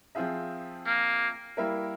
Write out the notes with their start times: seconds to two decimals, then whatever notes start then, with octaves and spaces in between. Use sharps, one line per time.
0.15 F3 C4 F4 G#4 E5
0.86 A#3
1.57 G3 A#3 E4 A#4 E5